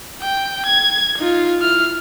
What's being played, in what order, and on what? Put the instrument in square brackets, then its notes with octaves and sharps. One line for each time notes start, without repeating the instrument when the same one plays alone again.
[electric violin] G5
G#6
D#4 F4
E4 F6